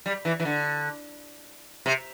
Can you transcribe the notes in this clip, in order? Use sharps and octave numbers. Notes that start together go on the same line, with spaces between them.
G3
E3
E3
D3
C3